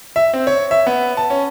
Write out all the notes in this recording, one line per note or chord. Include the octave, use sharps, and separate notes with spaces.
E5
C4
C#5
E5
B3
A5
C#4